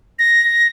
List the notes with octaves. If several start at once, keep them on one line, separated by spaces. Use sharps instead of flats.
A#6